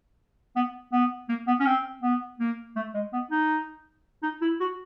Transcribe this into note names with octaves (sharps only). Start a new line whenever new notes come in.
B3
B3
A#3
B3
C#4
C4
B3
A#3
A3
G#3
B3
D#4
D#4
E4
F#4